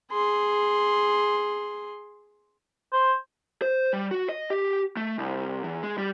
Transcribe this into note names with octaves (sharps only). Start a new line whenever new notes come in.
G#4 C6
C5
C5
G3
F#4
D#5
G4
A3
C2
E2
G#3
G3